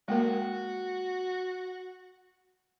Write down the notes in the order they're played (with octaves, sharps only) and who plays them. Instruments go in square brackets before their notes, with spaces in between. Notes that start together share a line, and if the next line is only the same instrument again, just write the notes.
[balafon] G#3 A#3 A#4 [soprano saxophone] F#4